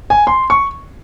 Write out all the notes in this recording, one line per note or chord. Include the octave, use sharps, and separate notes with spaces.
G#5
C6
C#6